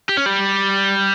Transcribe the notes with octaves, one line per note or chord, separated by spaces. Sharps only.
G4
C#4
G3